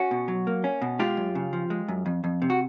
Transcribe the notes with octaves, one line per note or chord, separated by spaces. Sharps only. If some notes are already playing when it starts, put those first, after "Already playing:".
Already playing: C#4 F#4
B2
F#3
A#3
C#4
B2
G#3 F4 G4
F#2
C#3
F3
G#3
F#2
F2
F2
C3
F#4